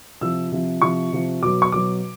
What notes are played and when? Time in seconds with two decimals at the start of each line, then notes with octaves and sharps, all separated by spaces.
0.21 C3 F3 E6
0.52 C3 F3
0.82 C3 F3 C#6
1.12 C3 F3
1.42 B2 F#3 D6
1.62 C#6
1.72 B2 F#3 D6